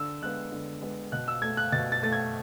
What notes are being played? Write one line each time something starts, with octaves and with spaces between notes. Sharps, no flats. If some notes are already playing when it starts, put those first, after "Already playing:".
Already playing: D3 E6
G#3 B3 F#6
D3
G#3 B3
B2 F#6
E6
A3 G#6
F#6
B2 A6
A6
A3 A6
G#6